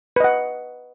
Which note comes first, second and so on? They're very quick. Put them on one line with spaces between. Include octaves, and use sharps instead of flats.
B4 D#5 F#5